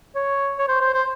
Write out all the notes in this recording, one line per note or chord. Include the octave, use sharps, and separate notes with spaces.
C#5
C#5
C5
C5
C5